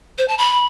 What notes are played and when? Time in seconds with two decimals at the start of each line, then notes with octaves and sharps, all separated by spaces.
0.18 C5
0.28 A5
0.38 B5